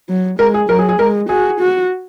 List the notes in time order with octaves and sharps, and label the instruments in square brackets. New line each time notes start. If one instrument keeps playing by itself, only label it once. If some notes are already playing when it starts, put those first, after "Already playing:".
[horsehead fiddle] F#3
[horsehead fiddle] G#3 [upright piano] A#4
[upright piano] G#4
[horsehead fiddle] F#3 [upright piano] A#4
[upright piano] G#4
G#4
[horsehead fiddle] G#3 [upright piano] A#4
[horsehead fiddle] F#4 [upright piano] G#4
[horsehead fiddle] F#4